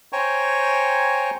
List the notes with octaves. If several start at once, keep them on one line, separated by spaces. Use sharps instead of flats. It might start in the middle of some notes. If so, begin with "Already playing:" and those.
C5 C#5 G5 G#5 A#5 C#6